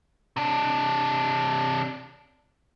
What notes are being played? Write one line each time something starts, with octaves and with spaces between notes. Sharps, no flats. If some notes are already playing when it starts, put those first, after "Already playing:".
C3 D4